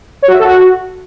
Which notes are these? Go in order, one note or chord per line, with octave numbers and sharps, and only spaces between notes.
C#5
F#4
E5
A4
F#4